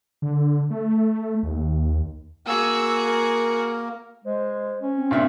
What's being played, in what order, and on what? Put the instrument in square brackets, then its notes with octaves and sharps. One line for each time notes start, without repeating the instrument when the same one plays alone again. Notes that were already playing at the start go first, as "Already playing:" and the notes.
[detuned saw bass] D3
A3
D#2
[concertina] A#3 [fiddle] F#4 G#4 [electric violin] E6
[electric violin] A#4
[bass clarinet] G#3 [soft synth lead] C5
[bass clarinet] C#4
[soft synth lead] C4
[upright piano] G2 A#2 E5